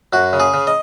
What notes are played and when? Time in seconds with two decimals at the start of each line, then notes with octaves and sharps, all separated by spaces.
0.13 F#2 F#4
0.33 C#3
0.40 G#4
0.54 C#3
0.67 D#5